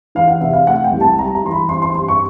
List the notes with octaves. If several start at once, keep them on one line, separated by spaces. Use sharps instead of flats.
E3 F5
F#5
C3 E5
F5
A3 F#5
G5
C2
A5
G3 A#5
A#5
E3 C6
B5
C4 C6
C6
G2 C6
C#6